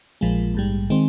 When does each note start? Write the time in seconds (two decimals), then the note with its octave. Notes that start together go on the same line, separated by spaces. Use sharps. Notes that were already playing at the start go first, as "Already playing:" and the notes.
0.21 A#1 A#2 F3 G#3
0.54 A#1 G#2 G3
0.90 D#3 G#3 C4